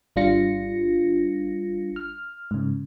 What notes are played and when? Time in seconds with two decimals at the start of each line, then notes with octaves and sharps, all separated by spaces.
0.16 G#1 G3 D4 F4 A#6 C#7
1.96 F6
2.51 G#2 C#3